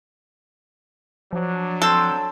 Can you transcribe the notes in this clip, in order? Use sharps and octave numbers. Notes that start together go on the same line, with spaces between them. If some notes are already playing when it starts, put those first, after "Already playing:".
F3 F#3 D4
C4 A4 C5 E6